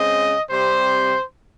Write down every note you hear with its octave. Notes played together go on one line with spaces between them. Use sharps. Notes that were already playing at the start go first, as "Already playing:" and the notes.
Already playing: C#3 G#3 C4 D#5
C3 G3 C4 C5